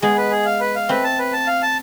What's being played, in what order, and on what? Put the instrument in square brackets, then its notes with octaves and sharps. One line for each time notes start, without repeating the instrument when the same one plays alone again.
[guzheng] G#3 B3 [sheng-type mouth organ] G#4
[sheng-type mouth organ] B4
G#4
F5
B4
F5
[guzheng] A3 C4 [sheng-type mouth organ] B4
[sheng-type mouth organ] A5
B4
A5
F5
A5